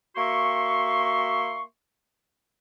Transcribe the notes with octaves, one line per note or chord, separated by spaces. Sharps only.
A#3 F#4 E5 C6 C#6